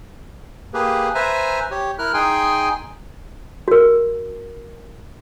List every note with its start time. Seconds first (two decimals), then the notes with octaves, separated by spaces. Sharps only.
0.74 A#3 G4 G#4 B4
1.15 B4 C5 E5 G#5 A#5
1.71 G4 C#5
1.99 E4 A#4 F6 F#6
2.14 D#4 G#4 G5 G#5 C6
3.68 F#4 A#4